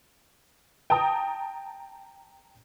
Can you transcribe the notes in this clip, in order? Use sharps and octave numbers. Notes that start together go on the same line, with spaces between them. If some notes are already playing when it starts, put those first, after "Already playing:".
G5 A5 A#5 D#6